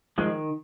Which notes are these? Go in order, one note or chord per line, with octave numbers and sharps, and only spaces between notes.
D#3 F3 G#3